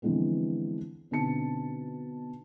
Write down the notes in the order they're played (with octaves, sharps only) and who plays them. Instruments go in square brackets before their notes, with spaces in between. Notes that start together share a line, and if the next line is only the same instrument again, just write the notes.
[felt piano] D3 E3 F3 G#3 B3 C4
B2 D3 C4 D#4 A5 C#7